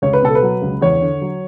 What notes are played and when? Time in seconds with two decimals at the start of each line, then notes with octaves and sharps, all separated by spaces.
0.02 C#2 C#5
0.13 B4
0.22 B2 A4
0.35 B4
0.42 F#3
0.62 C#2
0.81 E2 C#5
1.02 D3
1.21 F#3